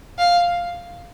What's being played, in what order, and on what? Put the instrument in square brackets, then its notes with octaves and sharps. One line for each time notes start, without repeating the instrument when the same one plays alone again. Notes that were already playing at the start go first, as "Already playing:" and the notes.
[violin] F5